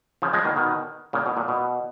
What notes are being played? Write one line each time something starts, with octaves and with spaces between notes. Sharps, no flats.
C#3 F3
F3 G#3
B2 D#3
B2 D#3
A#2 C#3
B2
A#2
B2